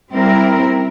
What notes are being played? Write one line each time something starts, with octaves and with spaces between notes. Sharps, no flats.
G3 C4 E4 A#4